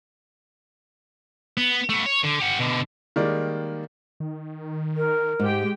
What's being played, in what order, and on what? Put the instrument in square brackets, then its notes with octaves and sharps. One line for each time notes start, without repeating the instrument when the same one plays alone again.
[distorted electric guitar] B3
A3 B3
C#5
D3
G4 F#5
B2 D3
[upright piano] D#3 G3 G#3 A#3 D#4 D5
[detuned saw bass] D#3
[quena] A#4
[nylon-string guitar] G#2 [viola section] G#3 G4 G5